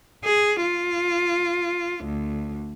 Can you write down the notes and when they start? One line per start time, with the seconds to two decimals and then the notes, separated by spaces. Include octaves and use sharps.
0.24 G#4
0.62 F4
2.04 D2